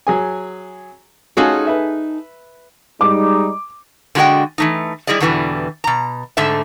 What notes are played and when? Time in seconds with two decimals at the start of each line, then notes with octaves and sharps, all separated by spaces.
0.07 F#3 G#4 G#5
1.37 C#4 D#4 F4 F#4 G#4 A4
1.67 B4 E5
3.01 G3 G#3 D#4 D6
4.15 D3 G#3 F#4 A4 D#5 G5
4.58 E3 A3 D#4
5.07 G3 E4 G#4 D5 D#5
5.20 E2 B2 D3 E3 F#3 G3
5.84 B2 A#5
6.37 G#2 D3 A3 E5